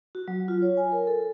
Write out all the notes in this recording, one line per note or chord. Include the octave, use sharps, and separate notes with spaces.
F#4
F#3
F4
C#5
G#5
A#4
A4